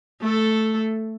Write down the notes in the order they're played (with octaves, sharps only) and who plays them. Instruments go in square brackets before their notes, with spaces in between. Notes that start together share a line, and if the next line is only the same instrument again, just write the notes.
[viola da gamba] A3 A4